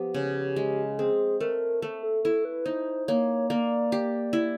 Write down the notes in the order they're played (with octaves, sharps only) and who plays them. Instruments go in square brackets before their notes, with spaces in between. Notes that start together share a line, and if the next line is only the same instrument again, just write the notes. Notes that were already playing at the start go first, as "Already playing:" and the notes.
Already playing: [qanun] F3 B3 [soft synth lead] G4
[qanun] C#3
G#3
[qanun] C4 [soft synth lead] G#4
[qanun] A3 [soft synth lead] A#4
[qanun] A3
[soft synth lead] A4
[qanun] E4 [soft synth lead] A4
[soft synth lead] B4
[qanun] D#4 [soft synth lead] C5
[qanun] A#3 [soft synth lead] C#5
[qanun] A#3 [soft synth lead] D5
[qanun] G4
E4